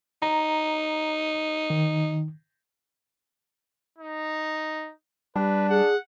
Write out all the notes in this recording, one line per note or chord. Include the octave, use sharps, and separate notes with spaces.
D#4 A#5
D#3
D#4
G3 D4 B4
G#4 F#5